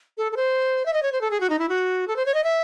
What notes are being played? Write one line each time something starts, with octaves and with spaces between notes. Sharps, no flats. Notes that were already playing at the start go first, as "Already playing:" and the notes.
A4
A4
C5
E5
D#5
C#5
C5
A4
G#4
F#4
D#4
E4
F#4
A4
C5
C#5
D#5
E5